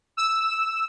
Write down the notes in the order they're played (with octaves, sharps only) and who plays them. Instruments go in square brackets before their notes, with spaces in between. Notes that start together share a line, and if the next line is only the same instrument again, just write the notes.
[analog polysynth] E6